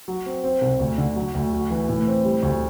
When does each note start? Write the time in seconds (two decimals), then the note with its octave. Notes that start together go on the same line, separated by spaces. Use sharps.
0.08 F#3
0.26 C4
0.44 C4
0.61 C2
0.80 D2
0.98 D3
1.16 F#3
1.35 D2
1.53 F#4
1.70 E3
1.89 A2
2.07 C4
2.25 G3
2.43 D2